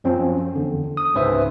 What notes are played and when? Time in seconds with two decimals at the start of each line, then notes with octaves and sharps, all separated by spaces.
0.04 F#2 F3 C4 C#4
0.56 E2 D3
0.97 D#6
1.14 C#2 G#2 C#4 B4 C5 E5